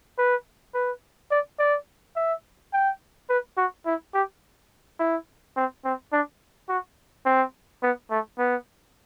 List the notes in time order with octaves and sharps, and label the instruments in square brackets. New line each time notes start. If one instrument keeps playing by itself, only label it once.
[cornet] B4
B4
D5
D5
E5
G5
B4
F#4
E4
G4
E4
C4
C4
D4
F#4
C4
B3
A3
B3